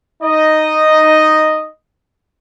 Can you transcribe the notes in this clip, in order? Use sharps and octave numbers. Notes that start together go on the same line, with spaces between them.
D#4 D#5